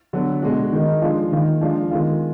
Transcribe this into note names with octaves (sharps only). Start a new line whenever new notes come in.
D3 F#3 B3
B2 G#3 D4 F#4
D#3 G#3 D#4
F3 G#3 D4 F4
D#3 A#3 F4
F3 G#3 D4 F4
D#3 G#3 B3 F4